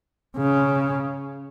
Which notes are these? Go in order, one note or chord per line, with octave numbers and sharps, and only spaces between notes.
C#3